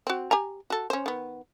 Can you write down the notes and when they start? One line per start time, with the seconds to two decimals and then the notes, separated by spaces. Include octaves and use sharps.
0.07 C4 F#4
0.31 G4 G#5 A#5
0.70 F#4 A4
0.90 C#4 C5
1.06 D#3 B3